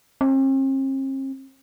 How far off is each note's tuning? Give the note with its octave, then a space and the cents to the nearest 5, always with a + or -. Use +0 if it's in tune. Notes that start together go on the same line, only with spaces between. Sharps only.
C4 +45